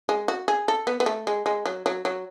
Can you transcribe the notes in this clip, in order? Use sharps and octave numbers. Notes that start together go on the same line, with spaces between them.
G#3
F#4
G#4
A4
B3
B3
A3
G#3
G#3
F#3
F#3
F#3